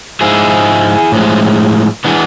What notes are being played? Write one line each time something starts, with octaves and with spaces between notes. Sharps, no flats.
G#2 F3 G#3 E4 G#4
A2 F3 G#3
E3 G#3 B3 D4